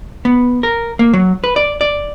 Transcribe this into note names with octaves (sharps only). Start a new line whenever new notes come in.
B3
A#4
A#3
F#3
B4
D5
D5